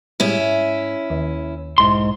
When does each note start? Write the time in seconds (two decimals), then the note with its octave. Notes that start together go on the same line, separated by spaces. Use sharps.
0.20 A2 G3 G#3 C#4 E4
0.39 G#2
1.10 D#2
1.78 B1 G#2 E4 C6